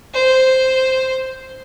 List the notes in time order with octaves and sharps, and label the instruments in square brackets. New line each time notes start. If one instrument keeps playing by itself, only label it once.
[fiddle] C5